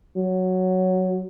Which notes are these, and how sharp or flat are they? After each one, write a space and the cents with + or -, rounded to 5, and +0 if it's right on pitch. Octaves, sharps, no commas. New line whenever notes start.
F#3 +0